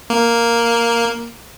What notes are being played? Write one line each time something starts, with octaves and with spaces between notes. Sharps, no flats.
A#3